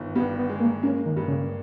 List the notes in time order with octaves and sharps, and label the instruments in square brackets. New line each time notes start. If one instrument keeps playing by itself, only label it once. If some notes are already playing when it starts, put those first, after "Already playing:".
Already playing: [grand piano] G1 D#3
[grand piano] G2 [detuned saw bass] B3
[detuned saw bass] B3
[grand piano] G#3
[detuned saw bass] A#3
[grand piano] A#3 [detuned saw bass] C#4
[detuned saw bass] D#3
[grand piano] G2
[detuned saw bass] C#3